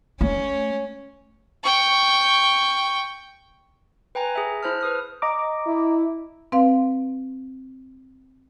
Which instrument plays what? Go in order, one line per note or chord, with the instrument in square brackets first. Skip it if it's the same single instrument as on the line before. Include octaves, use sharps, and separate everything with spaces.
[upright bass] A3 [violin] C#4
[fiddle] G5 C#6
[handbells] B4 G5 G#5 A#5
G#4 E5
E4 C5 A5 F6
B4 D#6 F6
[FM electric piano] D#5 A#5 D6
[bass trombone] E4
[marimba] C4 B4 F5